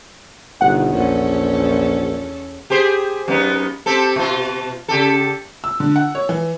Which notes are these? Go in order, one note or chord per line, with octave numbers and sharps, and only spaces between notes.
G1 B2 D#3 F#5
A#1 E2 C#4 A4
G4 G#4 C5
F#2 B3 D#4
C4 G4 A4
B2 F4
C#3 G4 A4
E6
D3
F#5
C#5
E3